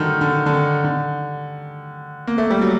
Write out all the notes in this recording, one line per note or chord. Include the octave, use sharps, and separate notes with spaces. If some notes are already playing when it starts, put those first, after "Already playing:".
Already playing: D3 D#3 F#3 G3 A3
D3
D3
D#3
D3
A#3
A3
G3
F#3